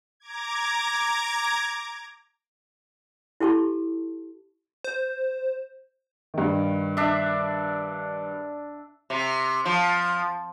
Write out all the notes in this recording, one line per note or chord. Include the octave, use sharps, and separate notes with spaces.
A#5 D6 G#6
E4 G4 A4 A5 C6 C#6
C5
G2 D#3
D4 E5
C3
F3